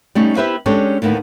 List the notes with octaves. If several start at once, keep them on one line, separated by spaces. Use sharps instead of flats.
G3 A3 C#4 D#4
B3 E4 G4 B4 C5 E5
G#3 C#4 D4 G4 A4 C#5
D2 A2 D#3 A#3 B3